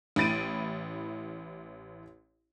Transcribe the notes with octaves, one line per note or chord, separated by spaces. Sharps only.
A1 E4 B5 A6 D7 D#7